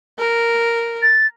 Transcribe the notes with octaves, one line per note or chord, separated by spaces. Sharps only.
A#4
A6